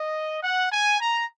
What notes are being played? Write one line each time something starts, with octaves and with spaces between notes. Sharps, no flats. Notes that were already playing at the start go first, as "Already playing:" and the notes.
Already playing: D#5
F#5
G#5
A#5